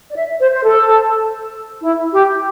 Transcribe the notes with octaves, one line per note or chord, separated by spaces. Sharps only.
D5
E5
C5
C5
A4
E4
G4